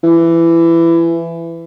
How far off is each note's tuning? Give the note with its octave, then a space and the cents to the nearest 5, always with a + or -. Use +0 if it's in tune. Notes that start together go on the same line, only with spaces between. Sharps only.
E3 +20